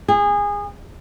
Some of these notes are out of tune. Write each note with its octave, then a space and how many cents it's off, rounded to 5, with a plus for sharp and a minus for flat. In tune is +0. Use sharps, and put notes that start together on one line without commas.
G#4 -25